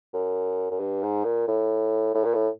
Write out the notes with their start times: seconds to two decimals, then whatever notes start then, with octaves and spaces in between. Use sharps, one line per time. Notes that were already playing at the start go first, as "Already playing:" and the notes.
0.13 F#2
0.71 F#2
0.80 G2
1.03 G#2
1.24 A#2
1.48 A2
2.15 A2
2.24 A#2
2.34 A2